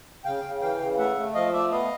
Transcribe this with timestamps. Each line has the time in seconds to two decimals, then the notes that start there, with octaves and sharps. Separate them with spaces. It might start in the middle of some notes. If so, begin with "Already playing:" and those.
0.25 C#3 F5 G5
0.44 C#3
0.61 E3 F5 G5
0.80 C#3
0.98 A3 E5 F#5
1.17 A3
1.34 F3 D#5 F5
1.53 A3 D5 E5
1.71 B3 D#5 F5